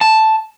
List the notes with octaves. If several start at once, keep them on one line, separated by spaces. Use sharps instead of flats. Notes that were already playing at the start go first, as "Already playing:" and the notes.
A5